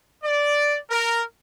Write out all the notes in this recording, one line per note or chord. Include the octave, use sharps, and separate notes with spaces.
D5
A#4